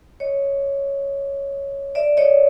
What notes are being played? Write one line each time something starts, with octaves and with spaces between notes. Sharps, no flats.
C#5 D#5
D5 E5
C#5 D#5